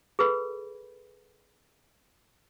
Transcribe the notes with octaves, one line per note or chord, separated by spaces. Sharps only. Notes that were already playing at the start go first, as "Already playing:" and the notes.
G#4 A4 B4 B5